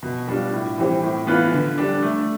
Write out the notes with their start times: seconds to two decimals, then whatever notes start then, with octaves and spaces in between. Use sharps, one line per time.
0.03 B2
0.28 G3 D4 F4
0.53 A2
0.78 E3 G3 C4 G4
1.03 A2
1.27 E3 B3 F4 B4
1.53 D3
1.78 G3 D4
2.02 A3